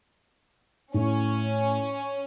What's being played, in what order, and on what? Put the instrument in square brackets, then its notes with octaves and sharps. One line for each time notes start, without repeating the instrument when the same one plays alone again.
[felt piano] A2 [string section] C#4